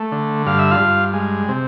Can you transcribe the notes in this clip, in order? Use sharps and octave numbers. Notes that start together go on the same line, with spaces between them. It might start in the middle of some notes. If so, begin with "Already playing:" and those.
Already playing: A3
D3
G2 F5
E5
F4 F5
G2
G#3
C3